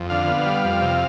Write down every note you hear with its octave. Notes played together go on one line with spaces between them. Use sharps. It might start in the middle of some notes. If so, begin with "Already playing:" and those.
Already playing: F2
D3 F5
B3
G3
F2
C3